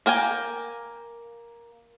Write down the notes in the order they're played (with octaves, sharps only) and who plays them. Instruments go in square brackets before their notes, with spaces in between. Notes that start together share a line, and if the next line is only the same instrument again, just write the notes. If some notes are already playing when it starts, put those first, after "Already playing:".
[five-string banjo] A#3 A#4 G5 G#5